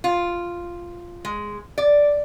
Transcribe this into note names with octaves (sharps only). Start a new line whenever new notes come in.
F4
G#3
D5